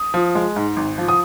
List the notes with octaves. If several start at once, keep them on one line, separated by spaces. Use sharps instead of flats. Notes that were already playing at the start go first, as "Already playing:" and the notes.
Already playing: D#6
F3
G#3
G#2
G#1
F3
D#6